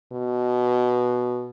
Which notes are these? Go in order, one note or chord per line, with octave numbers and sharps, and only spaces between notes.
B2